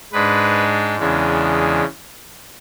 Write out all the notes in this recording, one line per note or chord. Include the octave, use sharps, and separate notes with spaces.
G#2 G#3 D4 B4
E2 C#3 E3 G#3 D4